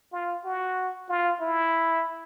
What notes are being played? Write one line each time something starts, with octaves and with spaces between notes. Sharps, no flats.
F4
F#4
F4
E4